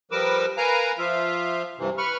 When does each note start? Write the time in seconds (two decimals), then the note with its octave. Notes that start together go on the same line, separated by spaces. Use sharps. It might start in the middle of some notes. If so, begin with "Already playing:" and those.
0.11 F3 G3 A#4 B4 D6 E6
0.57 A#4 B4 F5 G#5 A#5
0.98 F3 F4 E5 F5
1.78 G2 C3 E3
1.98 B4 B5 C#6 F6